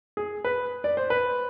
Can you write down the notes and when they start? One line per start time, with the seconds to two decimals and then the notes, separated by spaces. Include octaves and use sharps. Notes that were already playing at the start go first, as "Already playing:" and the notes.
0.17 G#4
0.44 B4
0.84 D5
0.97 C5
1.10 B4